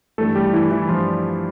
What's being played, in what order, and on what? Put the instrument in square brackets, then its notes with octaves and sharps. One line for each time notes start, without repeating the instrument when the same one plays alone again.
[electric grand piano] G2 E3 G3 A3 A4
G3 G4
E3 E4
E3 E4
G2 E3 F3 G3 F4